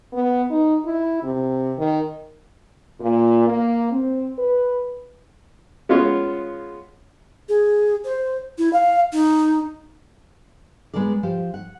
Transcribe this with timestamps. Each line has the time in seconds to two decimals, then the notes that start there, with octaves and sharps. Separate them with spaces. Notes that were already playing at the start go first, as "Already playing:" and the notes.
0.13 B3
0.51 D#4
0.85 E4
1.23 C3
1.79 D#3
3.00 A#2
3.48 A#3
3.92 C4
4.38 B4
5.89 G#3 B3 C#4 F4 C#5
7.49 G#4
8.05 C5
8.58 E4
8.73 F5
9.13 D#4
10.94 G#3 B3 G#4 A#4 D5
11.23 F3 G4 C5
11.54 F#5